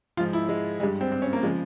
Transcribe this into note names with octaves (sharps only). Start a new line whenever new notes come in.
G#2 F3 F4
E4
G#3
G2 G3 G#3
C4
C4
C#4
A#3
C#3 F3 G#3